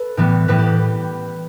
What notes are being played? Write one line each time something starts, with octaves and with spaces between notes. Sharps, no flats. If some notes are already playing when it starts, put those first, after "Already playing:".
Already playing: A4 B4
A2 E3 G3 B3
A2 E3 G3 B3 B4
G4